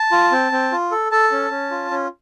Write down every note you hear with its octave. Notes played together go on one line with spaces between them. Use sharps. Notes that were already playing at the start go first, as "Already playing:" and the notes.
Already playing: A5
F4
C4
C4
F4
A4
A4 A5
C#4
C#4
F4
C#4